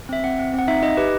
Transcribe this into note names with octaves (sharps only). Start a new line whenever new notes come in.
C4 E5
C4 F#5
C4
C4
F#5
D#4 E5
D#4 D#5
G4 B4